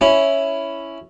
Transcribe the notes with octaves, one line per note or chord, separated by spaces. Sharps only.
C#4 E4